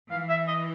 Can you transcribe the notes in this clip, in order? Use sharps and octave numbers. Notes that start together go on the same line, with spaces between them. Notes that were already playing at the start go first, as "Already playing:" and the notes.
E3 F5
E5
D#5